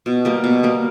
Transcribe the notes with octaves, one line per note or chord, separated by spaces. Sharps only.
B2
G3 A#3
B2
G3 A#3